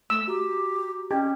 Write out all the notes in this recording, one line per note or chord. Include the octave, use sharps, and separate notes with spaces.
A3 E6
F#4 G4 A#5
C#4 G4 D#5